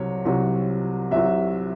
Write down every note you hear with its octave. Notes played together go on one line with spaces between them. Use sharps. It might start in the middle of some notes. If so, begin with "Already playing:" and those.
Already playing: C2 C3 F#3 C#5
C2 C3 F#3
C2 C3 F#3 E5